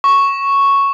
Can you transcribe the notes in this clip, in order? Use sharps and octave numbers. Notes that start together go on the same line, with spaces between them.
C#6